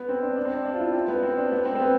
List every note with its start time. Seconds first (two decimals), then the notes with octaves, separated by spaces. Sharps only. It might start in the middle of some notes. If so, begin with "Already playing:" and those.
Already playing: B3
0.09 C4
0.22 D4
0.36 D4
0.45 C4
0.54 D4
0.65 D4
0.73 F4
0.80 E4
0.94 C4
1.08 B3
1.23 C4
1.37 D4
1.52 B3
1.65 C4
1.75 C4
1.79 B3